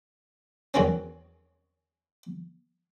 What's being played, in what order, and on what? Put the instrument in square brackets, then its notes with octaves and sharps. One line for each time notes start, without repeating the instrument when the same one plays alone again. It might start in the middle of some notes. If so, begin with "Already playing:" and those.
[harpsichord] E2 D#3 F#3 C4 C#4